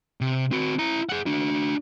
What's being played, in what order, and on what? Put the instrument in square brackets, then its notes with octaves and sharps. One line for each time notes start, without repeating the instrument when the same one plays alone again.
[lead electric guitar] C3
C4 F#4
E4 A#5
G#4 F#5
D4 F#4